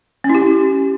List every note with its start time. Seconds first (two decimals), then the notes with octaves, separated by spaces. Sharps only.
0.24 C#4
0.29 E4
0.35 G4